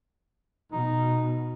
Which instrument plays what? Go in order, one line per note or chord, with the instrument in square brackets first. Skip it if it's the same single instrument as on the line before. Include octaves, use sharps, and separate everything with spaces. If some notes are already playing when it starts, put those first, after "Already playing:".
[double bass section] B2 [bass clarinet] D#4